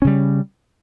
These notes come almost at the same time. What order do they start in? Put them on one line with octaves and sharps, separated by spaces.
C#4 C#3 G3